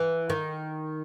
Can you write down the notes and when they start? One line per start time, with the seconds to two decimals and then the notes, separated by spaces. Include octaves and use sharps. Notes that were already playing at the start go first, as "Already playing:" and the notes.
Already playing: E3
0.30 D#3